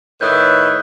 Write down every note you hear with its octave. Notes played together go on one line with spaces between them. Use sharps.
A2 D#3 B4 C#5 E5 D#6 F#6 G6